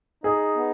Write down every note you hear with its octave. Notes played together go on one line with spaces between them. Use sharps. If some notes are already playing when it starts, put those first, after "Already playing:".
D#4 G#4
B3